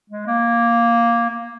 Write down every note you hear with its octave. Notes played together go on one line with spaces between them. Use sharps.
G#3
A#3
A#3